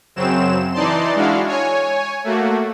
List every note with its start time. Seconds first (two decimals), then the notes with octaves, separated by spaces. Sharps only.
0.16 F#2 C#3 F#3 C4 E7
0.73 E3 D#4 D5 A5 C6
1.15 G#3 D4 E4 F#4 F5
1.47 C#5 G#5
2.24 A3 A#3 F#4